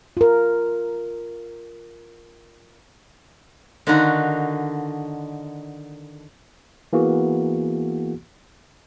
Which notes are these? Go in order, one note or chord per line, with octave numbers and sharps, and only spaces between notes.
F4 A#4
D3 D#3 D4 D#4 F4 F#4
E3 A#3 B3 F#4 G#4